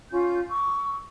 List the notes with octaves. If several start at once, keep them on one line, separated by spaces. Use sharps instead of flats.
C#4 F4 G6
C#6 D6 E6